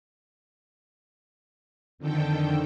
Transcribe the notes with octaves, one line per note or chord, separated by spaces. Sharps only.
F2 D3 D#3 A4 G5